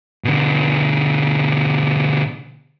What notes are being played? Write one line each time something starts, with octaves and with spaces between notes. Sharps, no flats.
B2 D3